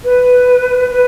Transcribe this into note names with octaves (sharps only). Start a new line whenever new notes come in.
B4
B4